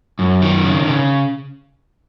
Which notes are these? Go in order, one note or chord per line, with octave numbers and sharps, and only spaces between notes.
F#2
D#3
C#3
C#3